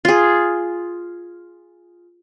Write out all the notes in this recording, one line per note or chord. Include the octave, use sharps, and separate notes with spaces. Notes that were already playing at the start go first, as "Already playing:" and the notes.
F4 G#4